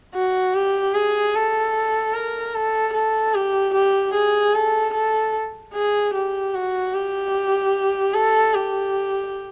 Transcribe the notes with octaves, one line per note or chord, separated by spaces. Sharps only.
F#4
G4
G#4
A4
A#4
A4
A4
G4
G4
G#4
A4
A4
G#4
G4
F#4
G4
A4
G4